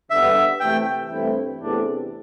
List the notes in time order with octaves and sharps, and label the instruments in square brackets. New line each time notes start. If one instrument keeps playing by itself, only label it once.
[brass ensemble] D3 G3 B3 [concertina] E5
[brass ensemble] C3 E3 A3 [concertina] G5
[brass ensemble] G2 E3 A3 C4 E4
E2 C3 E3 A3 D4